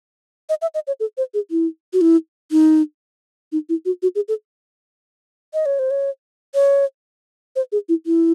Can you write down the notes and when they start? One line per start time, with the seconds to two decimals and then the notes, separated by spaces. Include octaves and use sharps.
0.49 D#5
0.62 E5
0.74 D#5
0.87 C#5
1.00 A4
1.17 C5
1.34 G#4
1.51 E4
1.93 F#4
2.01 E4
2.52 D#4
3.52 D#4
3.69 E4
3.85 F#4
4.03 F#4
4.15 G#4
4.28 A4
5.54 D#5
5.66 C#5
5.79 C5
5.91 C#5
6.54 C#5
7.56 C5
7.72 G#4
7.89 E4
8.06 E4